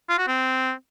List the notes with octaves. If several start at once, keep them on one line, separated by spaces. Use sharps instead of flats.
F4
F#4
C4